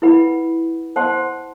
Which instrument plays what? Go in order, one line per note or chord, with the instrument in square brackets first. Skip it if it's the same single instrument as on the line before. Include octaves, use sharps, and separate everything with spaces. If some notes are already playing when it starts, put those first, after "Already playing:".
[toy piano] E4 B4 F#5 B5
C5 F#5 A5 C6